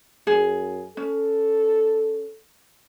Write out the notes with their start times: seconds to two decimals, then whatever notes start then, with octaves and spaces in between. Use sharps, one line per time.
0.27 F#2 G#4
0.97 C#4 A4